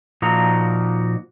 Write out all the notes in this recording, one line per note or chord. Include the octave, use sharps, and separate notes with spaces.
A#2 F3 A#3 D#4 F#4 A#5